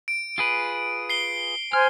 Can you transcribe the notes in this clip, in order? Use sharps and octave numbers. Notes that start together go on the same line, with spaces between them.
D7
F4 G#4 B4
C7 G7
C5 G#5 F6